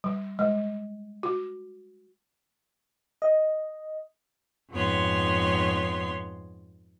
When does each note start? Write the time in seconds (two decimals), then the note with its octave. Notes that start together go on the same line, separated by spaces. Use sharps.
0.04 G3
0.39 G#3
1.23 F#4
3.22 D#5
4.71 F2 G#2 B3 C#5 C6